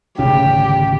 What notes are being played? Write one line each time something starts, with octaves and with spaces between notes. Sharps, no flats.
G#1 D2 C#3 G4